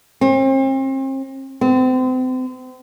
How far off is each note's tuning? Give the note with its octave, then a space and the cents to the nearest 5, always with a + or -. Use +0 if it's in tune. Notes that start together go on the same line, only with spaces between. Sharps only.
C4 +40
C4 -35